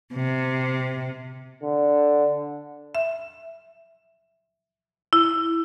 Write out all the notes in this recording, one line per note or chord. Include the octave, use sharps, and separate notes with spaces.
C3
D3
E5
E4